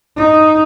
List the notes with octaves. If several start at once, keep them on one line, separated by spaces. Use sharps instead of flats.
D#4